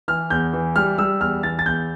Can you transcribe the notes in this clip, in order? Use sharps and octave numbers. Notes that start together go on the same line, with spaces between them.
E3 F6
E2 G6
E3
G3 F6
G3 E6
E2 F6
E3 A6
A6
E2 G6